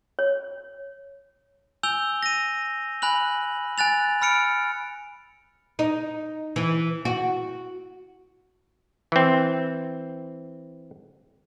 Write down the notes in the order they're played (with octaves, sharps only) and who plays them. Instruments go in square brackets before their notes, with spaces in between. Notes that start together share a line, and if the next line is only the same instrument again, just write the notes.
[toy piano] C#5
[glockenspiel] G#5 E6 G6 F7 G7
A#6 D#7
G#5 B5 F#6 F#7
G#5 F#6 A6 F7
B5 F6 C#7 D7
[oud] D#4
E3
F#4
[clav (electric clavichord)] E3 C4